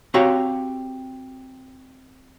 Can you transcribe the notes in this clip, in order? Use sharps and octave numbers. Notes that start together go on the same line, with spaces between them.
C4 F#4 G4 C#5 F5 A#5